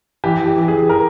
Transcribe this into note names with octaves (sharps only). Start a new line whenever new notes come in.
E3 G4
G4
E3
G#4
A#4